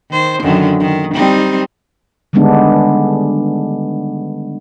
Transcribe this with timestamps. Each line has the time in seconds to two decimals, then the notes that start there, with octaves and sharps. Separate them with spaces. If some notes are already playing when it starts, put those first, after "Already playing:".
0.11 D#3 C5
0.43 F#2 D3 D#3
0.80 D#3
1.14 G3 C4 D#4
2.33 D3 D#3 G3 G#3 B3 D4